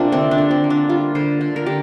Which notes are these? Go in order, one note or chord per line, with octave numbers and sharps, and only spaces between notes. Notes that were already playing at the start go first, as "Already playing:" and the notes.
Already playing: C3 A#3 D4 F4 G4
D3 C4
D4
D3
C4
A#3
D4
G3 F4
D3 C5
D3
A#4
D3 G4